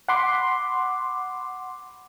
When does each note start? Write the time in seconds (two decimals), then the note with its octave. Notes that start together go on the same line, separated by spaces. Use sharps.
0.08 F#5 B5 C6 D6